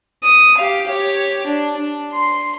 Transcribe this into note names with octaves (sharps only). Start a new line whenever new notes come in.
D#6
G4 F5
G4 C#5
D4
D4
C6